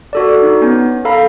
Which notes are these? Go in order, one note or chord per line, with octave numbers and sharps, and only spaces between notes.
F#4 A4 D5
D#4
B3 C#4
A4 F5 A#5 B5